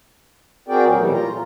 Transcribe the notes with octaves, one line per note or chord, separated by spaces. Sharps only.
C4 F#4 G#4 A#4 D5 G5
D#2 A#2 F#3
B2 E3 F#3 G3 A3
F4 A#5
A#2